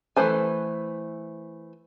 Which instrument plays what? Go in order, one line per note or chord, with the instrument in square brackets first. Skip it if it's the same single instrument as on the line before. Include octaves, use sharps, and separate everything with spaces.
[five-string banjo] E3 A3 B4 C5 G#5